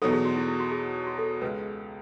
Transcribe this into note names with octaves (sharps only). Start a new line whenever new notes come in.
E2 B2 F#3 B3 D#4 A4
G#4
F#4
E4
E4
F#4
G#4
F#4
A4
C#2 C#3 G#3 B4